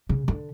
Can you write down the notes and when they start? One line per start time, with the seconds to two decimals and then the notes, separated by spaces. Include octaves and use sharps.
0.09 C#3
0.28 D3